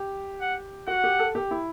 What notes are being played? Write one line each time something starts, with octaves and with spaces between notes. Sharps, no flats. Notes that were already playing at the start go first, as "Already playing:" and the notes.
Already playing: G4
F#5
F#4 F#5
G4
A4
G4
E4